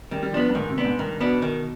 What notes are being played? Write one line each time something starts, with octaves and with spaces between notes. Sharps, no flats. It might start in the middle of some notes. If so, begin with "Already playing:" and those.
D#3 G3
G3
F3 B3 D4
G2
G#2 D#3
C3
B3 D4
G#2
G2 D#3
B2 B3 D4
D#3